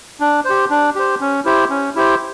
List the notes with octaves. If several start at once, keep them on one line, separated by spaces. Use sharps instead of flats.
D4
G4 C5
D4
G4 C5
C#4
E4 G4 C5
C#4
E4 G4 C5